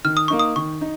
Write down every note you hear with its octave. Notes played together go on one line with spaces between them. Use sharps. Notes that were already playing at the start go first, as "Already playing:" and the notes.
D#3 F6
D#6
A#3 D#4 C#6
D#6
D#3 C#6
D#4